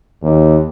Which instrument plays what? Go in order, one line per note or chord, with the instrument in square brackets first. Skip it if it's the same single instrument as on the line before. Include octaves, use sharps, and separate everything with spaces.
[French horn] D#2